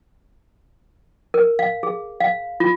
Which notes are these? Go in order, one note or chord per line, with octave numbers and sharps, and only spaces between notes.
A#4
F5
G#4
F5
F4